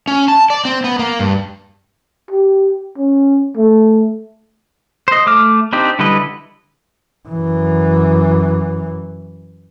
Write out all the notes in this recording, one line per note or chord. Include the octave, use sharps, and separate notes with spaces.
C#4
A5
D5
C4
B3
A#3
G2
G4
C#4
A3
C5 D#5
A3 D6 F6
C4 D4 D#4 G4
D3 G3 E4 B4 D#5
F#2 E3